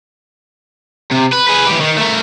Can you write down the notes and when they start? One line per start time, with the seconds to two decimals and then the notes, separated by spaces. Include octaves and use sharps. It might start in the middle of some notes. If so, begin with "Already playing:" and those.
1.11 C3
1.32 B4
1.48 G#4 B4
1.67 E3 G4
1.80 D#3
1.97 A3 A#4